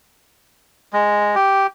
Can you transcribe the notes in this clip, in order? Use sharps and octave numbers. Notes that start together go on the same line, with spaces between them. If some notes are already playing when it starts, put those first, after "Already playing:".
G#3
G4